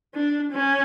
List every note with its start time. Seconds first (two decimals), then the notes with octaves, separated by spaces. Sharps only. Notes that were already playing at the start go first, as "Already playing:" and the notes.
0.15 D4
0.51 C#4